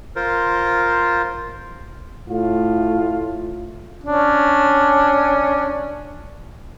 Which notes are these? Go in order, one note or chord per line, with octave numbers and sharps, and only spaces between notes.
F4 A#4 C5
A2 A3 F4
C#4 D4